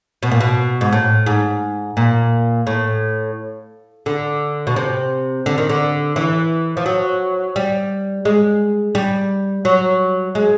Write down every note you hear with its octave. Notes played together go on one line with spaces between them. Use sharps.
B2
A#2
B2
G#2
A2
G#2
A#2
A2
D3
B2
C3
D3
D#3
D3
E3
F3
F#3
G3
G#3
G3
F#3
G#3